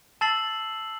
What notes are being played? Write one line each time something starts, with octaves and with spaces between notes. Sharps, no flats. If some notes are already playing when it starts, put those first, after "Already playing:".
A5 E6 A6 C7 F#7